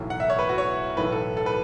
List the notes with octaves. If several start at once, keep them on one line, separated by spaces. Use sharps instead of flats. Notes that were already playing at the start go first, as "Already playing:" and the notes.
Already playing: B1 A2 E3
F#5
E5
C#5
B4
F#4
C#5
B1 A2 E3 B4
A4
A4
B4